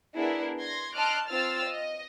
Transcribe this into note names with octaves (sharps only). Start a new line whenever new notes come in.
B3 D4 E4 G#4 A#4 B4
C6 G#6 A#6
D#5 A5 C6 D6 F6 F#6
C4 F4 C5 E6 F6 A6
D#5